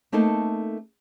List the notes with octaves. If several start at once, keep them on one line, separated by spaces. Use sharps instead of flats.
A3 A#3 C4 D#4 A4